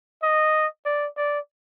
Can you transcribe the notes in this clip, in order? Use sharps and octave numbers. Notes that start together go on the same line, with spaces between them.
D#5
D5
D5